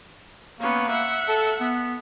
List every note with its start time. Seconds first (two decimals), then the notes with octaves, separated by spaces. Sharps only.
0.60 A#3 B3 C#4
0.89 E5 F#5
1.28 A4
1.61 B3